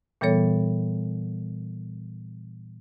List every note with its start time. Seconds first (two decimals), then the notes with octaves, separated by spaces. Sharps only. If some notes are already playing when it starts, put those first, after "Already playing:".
0.21 A#2 E3 G3 B3 A4 C#5